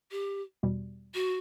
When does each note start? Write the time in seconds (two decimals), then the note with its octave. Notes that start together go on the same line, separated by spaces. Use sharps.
0.11 G4
0.63 E2 B2 G3
1.14 F#4